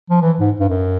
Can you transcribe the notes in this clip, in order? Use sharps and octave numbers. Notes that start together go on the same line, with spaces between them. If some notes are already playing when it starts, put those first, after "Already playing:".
F3
E3
G#2
G2
F#2